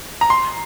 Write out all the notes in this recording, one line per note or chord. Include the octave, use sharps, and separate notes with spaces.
A#5
C6